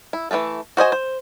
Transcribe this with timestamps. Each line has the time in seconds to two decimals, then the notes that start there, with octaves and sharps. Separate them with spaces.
0.13 E4
0.31 E3 G#3 A3 A4
0.77 F#4 C5 D#5 G#5
0.92 C5